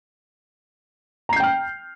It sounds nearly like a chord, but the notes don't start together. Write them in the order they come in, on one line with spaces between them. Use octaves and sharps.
A#5 C7 G6 G5 F6